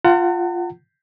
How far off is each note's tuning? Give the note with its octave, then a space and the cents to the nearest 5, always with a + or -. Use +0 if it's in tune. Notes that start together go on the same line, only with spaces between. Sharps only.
F4 +0 F#5 +25 A5 +45